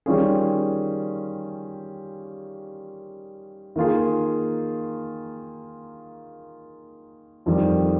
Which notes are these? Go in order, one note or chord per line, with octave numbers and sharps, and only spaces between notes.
D#3 G3 C#4 F4 G#4
D#3 A#3 F4 G#4
F2 D#3 G3